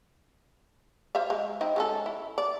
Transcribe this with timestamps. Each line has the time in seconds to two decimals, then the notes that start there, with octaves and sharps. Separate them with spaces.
1.15 C5 E5 F5
1.30 G#3
1.61 C4 D#4 E4
1.76 G#3 C#4 A4
2.06 E4
2.38 D5